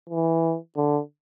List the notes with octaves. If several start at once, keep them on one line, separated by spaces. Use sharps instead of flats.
E3
D3